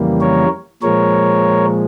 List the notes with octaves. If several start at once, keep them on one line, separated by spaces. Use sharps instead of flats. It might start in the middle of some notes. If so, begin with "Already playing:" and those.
Already playing: F2 C#3 E3 G3 A#3
A#4 C#5
A#2 F3 G#3 A#4 C#5